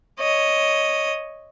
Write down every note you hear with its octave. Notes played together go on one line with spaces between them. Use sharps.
C#5 D#5